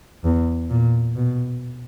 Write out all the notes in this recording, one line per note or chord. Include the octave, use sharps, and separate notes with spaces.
E2
A#2
B2